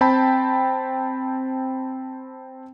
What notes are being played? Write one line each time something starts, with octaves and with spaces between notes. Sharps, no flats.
C4 G5 A5 B5